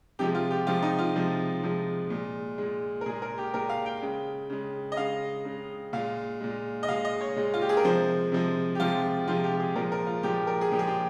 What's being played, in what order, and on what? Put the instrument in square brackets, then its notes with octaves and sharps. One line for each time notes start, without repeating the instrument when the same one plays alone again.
[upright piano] C3 F3 G#3 G4
F4
G4
C3 F3 G#3 F4
D#4
F4
C3 F3 G#3
C3 F3 G#3
A#2 G#3
A#2 G#3
A#4
A#2 G#4
G#3
A#4
G4
A#2 G#3 A#4
F5
G5
C#3 G#3
C#3 G#3
D#5
C#3 G#3 F5
C#3 G#3
A#2 G#3 F5
A#2 G#3
D#5
A#2 G#3 F5
D#5
C#5
A#2 G#3
F4
G4
G#4
A#4
C3 F3 G#3 C5
C3 F3 G#3
G4
C3 F3 G#3 F4
C3 F3 G#3 F4
G4
G4
G#4
A#2 F3 G#3 A#4
A#4
F4
A#2 F3 G#3 G4
A#4
G#4
A#2 F3 G#3 G4
G#4
G4